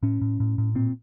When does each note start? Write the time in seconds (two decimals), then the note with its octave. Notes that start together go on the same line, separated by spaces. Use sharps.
0.03 A2 C#4
0.21 A2
0.40 A2
0.58 A2
0.75 A#2 C4